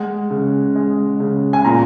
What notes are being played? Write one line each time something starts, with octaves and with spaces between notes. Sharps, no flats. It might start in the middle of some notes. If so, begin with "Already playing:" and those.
Already playing: G#3 F#5
C#3
G#3
C#3
G#5
A#2 A#5